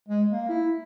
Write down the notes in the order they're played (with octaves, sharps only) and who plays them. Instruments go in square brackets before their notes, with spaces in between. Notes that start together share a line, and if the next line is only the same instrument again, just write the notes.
[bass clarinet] G#3
A#3
E4